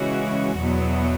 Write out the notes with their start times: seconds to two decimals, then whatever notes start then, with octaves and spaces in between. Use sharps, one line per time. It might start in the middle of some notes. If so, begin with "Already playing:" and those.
Already playing: C#3 E3 G#3 C#4 F#4
0.58 E2 B2 F#3 B3